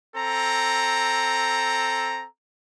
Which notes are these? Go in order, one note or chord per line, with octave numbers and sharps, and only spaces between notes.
C4 A4 A#5